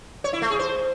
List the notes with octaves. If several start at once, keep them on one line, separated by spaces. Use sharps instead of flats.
C#5
E4
A3
G#4
C5